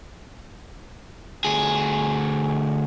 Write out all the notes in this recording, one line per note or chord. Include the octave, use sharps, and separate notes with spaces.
D2 G#4